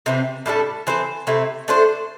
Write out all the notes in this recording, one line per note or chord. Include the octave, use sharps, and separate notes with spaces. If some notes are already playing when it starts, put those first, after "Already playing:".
C3 E3 C4
A2 G3 D4 A4
E3 C4 A4 C5
C3 A3 C4 E4
A3 D4 A4 C5